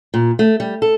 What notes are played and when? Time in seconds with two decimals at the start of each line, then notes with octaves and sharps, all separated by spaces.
0.14 A#2
0.39 A3
0.60 G3
0.82 A4